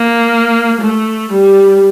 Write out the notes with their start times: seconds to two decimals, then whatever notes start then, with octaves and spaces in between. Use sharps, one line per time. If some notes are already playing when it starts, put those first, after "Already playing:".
Already playing: A#3
0.81 A3
1.32 G3